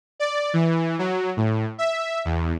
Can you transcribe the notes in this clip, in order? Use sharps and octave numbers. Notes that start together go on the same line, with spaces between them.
D5
E3
F#3
A2
E5
E2